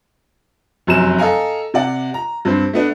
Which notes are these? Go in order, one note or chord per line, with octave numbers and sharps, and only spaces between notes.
F1 F#2 C3 F#3 E7
A4 D#5 F5 G#5 A#5
C3 D5 F#5
A#5
G2 C4 C5
A3 B3 D4